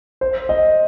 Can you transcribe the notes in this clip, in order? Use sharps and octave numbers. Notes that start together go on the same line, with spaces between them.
C5
D#5